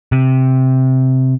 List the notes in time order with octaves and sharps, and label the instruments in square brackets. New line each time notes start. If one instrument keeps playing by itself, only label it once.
[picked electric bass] C3